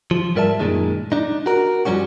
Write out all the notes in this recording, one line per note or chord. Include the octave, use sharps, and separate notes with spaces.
F3
G#2 G3 A#4 D5 E5 A5
F#2 A#2 D#3 G#3
D4 D#4
F#4 A#4
G2 F3 G3 C#4 F#4